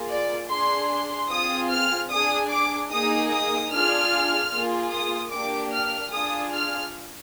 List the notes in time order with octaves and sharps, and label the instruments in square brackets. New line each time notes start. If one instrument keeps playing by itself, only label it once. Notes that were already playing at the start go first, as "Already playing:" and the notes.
Already playing: [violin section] A#3 F4 G#4
D5
D4 G#4 C6
C6
C4 F4 G#4 D#6
F6
D4 G#4 D#6
D6
A#3 D#4 G#4 D#6
D#6
D4 F4 G#4 F6
A#3 F4 G#4
D#6
A#3 D4 G4 D6
F6
D4 F4 G#4 D#6
F6